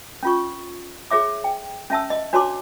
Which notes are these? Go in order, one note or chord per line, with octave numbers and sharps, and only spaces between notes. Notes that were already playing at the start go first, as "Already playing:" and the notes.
C#4 F4 C#6
G#4 C#5 E5 D6
G5
C#4 E5 A5 E6
D#5
D4 F#4 C#5 A5 C6 D6